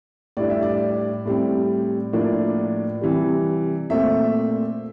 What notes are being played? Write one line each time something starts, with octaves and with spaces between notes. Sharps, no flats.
A2 G3 D4 D5
E5
D5
A2 G3 C4
A2 F3 A#3 D4
C3 E3 G3
A#2 A3 C4 E5